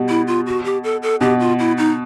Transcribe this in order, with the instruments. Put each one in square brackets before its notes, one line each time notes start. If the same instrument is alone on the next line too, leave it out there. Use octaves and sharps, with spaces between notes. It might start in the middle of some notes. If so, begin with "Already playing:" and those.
Already playing: [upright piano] B2 G3
[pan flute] E4
F4
F#4
G4
A4
A4
[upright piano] B2 [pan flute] G4
[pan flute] F4
E4
D#4